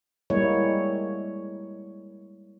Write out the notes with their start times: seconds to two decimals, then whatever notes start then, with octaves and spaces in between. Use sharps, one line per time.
0.30 G3 G#3 A#3 E4 C#5